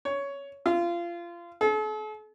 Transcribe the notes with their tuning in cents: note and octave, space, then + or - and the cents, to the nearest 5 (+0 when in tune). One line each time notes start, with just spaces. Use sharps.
C#5 +10
F4 -25
A4 -45